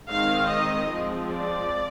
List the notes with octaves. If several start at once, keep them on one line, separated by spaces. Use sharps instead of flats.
D#3 G#3 C4 D#4 F5
D#5
F3 G#3 C4
D5